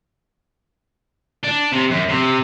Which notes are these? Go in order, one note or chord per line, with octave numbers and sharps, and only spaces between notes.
D4
C3
F#2
C3